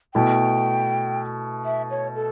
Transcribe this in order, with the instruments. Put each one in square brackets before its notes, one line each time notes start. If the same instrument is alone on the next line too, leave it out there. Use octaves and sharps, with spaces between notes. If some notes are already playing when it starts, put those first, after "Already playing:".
[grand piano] B2 A3 E4 [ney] G5
[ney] E5
C#5
A4